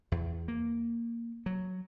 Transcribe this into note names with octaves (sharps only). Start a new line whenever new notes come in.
E2
A#3
F#3